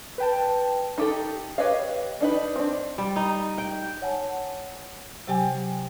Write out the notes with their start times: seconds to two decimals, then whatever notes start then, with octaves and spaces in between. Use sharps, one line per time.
0.18 B4 G5 A5
0.98 D#4 G4 A4
1.58 G4 B4 C#5 D#5 F5
2.21 D4 D#4 B4
2.56 C4 D4
2.98 G3
3.16 D#4
3.58 G5
4.02 C#5 F#5 G#5 A5
5.28 C3 F#3 G4 G5 G#5